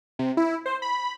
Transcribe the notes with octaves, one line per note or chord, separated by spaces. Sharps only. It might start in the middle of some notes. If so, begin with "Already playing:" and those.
C3
E4
C5
B5